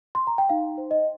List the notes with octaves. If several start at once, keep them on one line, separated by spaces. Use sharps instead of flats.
C6
A#5
G5
D#4 F5
C5
D#5